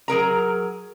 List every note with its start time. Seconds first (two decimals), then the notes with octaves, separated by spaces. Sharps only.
0.08 F#3 G#4 A#4 A#5